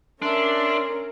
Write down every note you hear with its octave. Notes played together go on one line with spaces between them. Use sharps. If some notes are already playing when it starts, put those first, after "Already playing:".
C#4 D4 A#4 E5 C6